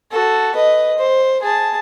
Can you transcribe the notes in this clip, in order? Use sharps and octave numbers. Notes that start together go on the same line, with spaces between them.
F#4 A4
B4 D#5
C5
G#4 A5